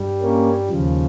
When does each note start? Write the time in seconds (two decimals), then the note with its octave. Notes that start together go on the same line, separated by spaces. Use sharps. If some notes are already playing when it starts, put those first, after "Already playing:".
Already playing: G2 G3
0.22 A#3 C#4
0.69 D#2 C#3 F3